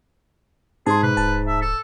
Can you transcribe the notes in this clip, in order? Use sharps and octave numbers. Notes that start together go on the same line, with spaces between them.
G#2 G#4 A5 C6
B2 B4
D1 A5
E5
A4